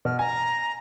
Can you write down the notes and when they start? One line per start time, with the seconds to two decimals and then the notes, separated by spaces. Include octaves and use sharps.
0.05 B2 F6
0.19 G#5 A#5